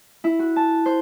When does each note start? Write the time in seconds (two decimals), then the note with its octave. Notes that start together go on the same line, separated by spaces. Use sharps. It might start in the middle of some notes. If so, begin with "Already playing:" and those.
0.24 E4
0.39 F#4
0.56 A5
0.86 C5